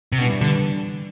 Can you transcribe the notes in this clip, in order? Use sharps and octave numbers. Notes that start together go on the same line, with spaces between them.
C3
B2 E3 G3 D4 G4 B4
D3